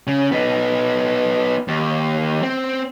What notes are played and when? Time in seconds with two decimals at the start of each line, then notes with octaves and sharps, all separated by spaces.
0.07 C#3
0.32 B3 D#4
1.68 D#2
2.43 C4